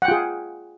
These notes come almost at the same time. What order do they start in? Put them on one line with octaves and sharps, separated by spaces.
F#5 G5 F4 G#4